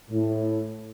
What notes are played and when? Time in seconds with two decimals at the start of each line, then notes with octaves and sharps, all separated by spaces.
0.11 A2